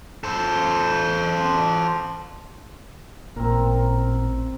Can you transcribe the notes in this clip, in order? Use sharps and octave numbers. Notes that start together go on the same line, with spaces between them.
A4 C5
A1 A#2 C4 A#4